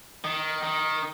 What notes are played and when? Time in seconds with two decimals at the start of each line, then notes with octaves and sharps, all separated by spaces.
0.24 D#3
0.63 D#3